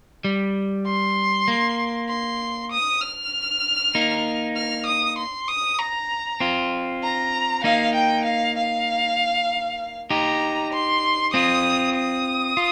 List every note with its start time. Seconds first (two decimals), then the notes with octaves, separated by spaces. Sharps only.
0.24 G3
0.86 C6
1.48 A#3
2.09 C6
2.71 D#6
3.02 F6
3.95 A#3 D#4
4.56 F6
4.86 D#6
5.18 C6
5.48 D#6
5.79 A#5
6.40 C4 F4
7.03 A#5
7.64 A#3 D#4 F5
7.95 G5
8.25 F5
8.57 F5
10.10 D#4 G4 A#5
10.73 C6
11.34 C4 F4 D#6
11.96 D#6
12.57 F4